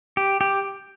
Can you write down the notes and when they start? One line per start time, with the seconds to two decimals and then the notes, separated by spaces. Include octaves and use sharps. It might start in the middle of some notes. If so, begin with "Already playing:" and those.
0.17 G4
0.41 G4